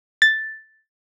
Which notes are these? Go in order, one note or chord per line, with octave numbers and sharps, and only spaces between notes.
A6